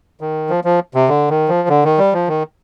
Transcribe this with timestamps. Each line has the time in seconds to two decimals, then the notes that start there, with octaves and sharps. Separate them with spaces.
0.21 D#3
0.50 F3
0.64 F3
0.94 C3
1.09 D3
1.30 D#3
1.48 F3
1.69 D3
1.84 D#3
1.98 G3
2.13 F3
2.28 D#3